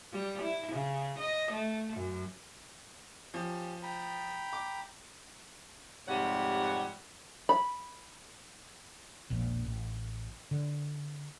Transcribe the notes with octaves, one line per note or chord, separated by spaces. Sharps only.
G3
E4
C#3
D#5
A3
F#2
F3 C#4 G4
G5 A#5 B5
D6
F2 G#2 C3 G3 C#5 F#5
B5
E1 A#1 A#2 F3
A1
D3